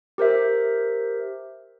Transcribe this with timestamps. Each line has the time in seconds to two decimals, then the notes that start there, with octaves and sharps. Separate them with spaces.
0.18 G4 A#4 C5 E5